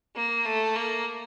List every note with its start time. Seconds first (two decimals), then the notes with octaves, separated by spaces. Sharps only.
0.16 A#3
0.46 A3
0.76 A#3